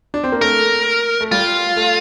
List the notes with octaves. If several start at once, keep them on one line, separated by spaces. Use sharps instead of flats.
D4
C4
A#3
A3 A#4
A3
G3 F4
A3